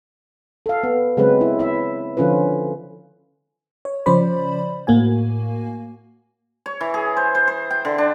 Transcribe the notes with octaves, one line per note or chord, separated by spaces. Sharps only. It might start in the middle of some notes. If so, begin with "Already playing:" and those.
A4 F5
B3
C#3 F#3 G#3 B3 C4 B4
E4
E4 E5
D3 F3 C#4 F4 B4
C#5
C#3 F3 C#4 C5 D5 B5
A2 A#3 F#4 G#5
C#5
E3
G#4
C5
C5
C5
G5
D3
D4